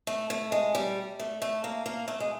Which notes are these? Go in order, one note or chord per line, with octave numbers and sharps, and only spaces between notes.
A3
A3
G#3
G3
A3
A3
A#3
A#3
A3
G#3